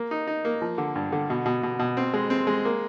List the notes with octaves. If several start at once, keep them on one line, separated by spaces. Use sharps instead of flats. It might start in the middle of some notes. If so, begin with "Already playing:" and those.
Already playing: A#3
D#4
D#4
A#3
F3
D3
G2
D3
B2
B2
B2
B2
C4
G#3
C4
G#3
A#3